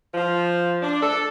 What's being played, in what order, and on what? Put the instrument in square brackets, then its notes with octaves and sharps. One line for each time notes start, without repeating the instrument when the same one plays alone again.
[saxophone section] F3
D4
A4